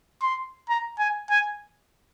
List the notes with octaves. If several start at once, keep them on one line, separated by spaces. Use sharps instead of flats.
C6
A#5
G#5
G#5